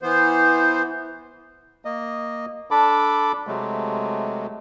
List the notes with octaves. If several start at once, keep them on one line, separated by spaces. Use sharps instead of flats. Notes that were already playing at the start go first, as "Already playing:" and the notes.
E3 B3 C5
A#3 D#5
D4 A4 B5 D6
C3 F#3 G#3 A3